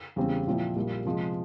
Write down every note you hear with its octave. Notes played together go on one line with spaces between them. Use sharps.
E2 C#3 G3 C4
A#2 F3 C4 E4
A#1 A#2 G3 A#3
C3 F3 G#3